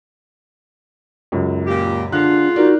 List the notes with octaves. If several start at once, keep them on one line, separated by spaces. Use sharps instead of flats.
C#2 F#2
A#2 G4
D3 G#3 D4 F4 F#6
D#4 F#4 A#4 D5